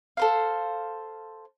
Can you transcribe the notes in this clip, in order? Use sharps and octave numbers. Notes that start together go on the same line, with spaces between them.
A4 C5 F5